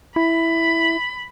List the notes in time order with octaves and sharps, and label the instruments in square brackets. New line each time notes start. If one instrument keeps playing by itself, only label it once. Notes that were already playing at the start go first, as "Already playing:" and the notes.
[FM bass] E4 [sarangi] B5